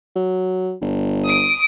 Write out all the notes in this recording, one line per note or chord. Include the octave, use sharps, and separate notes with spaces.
F#3
G1
D#6 D7